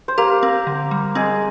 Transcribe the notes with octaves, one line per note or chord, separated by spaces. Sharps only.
C5
A#3 G4 A#4
C4
D3
G3
G#3 C4 G#4